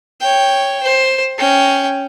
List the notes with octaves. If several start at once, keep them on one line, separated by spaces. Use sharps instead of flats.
C#5 G5
C5
C#4 G5